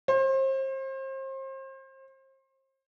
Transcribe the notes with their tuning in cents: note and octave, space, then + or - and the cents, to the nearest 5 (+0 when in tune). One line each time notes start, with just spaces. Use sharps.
C5 +35